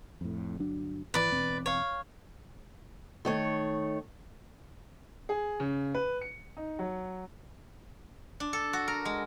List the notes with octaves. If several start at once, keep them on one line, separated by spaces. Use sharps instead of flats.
F2 A2
G1 F#3 D4
G#1 E3 B4 D5
E1 E2 C4
C#5 F5
D#3 A3 C#5
G#4
C#3
B4
C#7
D#4
F#3
D4
A4
F#4
A#4
G#3